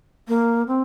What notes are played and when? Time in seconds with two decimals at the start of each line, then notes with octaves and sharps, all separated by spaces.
0.28 A#3
0.68 C4